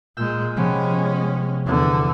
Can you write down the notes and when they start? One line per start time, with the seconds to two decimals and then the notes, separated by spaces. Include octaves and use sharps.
0.17 A#2 G#3 E6 F6 G6
0.57 C3 F3 G#3 B3 C#4
1.66 E2 D3